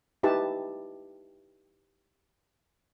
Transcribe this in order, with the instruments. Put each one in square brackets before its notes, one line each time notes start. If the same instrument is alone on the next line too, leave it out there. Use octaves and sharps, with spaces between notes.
[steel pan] D#4 E4 G4 B4 A5